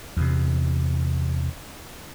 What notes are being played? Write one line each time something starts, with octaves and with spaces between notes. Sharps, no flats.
E2 C3